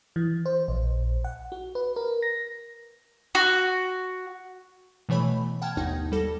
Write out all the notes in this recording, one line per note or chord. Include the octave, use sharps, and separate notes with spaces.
E3
C5
A#1
F#5
F#4
B4
A#4
A#6
F#4
B2 E3 A3 C#5 B5
F#5 G5 A5 F6 G#6
G1 D#2 D#4 F#5 G#6
G3 A4 A#6